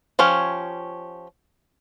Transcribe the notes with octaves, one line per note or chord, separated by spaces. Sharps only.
F3 C#4 G4 C#5